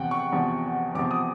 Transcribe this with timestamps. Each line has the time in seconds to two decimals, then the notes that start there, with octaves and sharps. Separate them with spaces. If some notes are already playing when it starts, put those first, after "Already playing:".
Already playing: E2 C3 F3 F#5 G5
0.11 C#6
0.33 E2 C3 F3
0.95 E2 C3 F3 D6
1.11 D#6